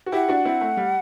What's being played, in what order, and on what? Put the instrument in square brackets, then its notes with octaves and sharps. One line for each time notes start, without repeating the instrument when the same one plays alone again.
[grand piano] F#4
[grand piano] E4 G4 [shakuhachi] F#5
[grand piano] D4 F#4
C4 E4
A3
G3